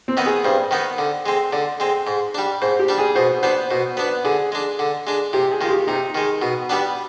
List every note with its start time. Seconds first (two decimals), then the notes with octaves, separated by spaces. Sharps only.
0.08 C4
0.17 D#3 B3 D#4
0.26 G#4
0.45 G2 C5
0.71 D#3 B3 D#4
0.98 D3
1.26 G#3 C4
1.53 D3 D5
1.80 G#3 C4
2.07 G#2
2.35 G3 D4
2.62 G#2 C5
2.79 G4
2.88 G3 D4
2.98 G#4
3.15 B2 C5
3.43 B3 D4 C5
3.71 B2 C5
3.97 B3 D4 B4
4.25 D3 G#4
4.52 G#3 D4
4.79 D3
5.07 G#3 D4
5.33 C3 G4
5.51 G#4
5.61 D#3 G#3 F4
5.70 G4
5.87 C3 D#4
6.15 D#3 G#3
6.42 B2
6.70 G3 B3 D4